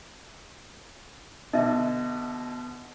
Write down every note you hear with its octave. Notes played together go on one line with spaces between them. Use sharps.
B2 D3 D#5 E5